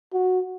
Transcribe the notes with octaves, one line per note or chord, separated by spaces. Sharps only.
F#4